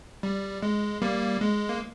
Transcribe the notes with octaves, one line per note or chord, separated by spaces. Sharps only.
G3
G#3
G3 A#3
G#3
A#3